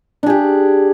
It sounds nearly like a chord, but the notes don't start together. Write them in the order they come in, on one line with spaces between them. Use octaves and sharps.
D4 G#4 G4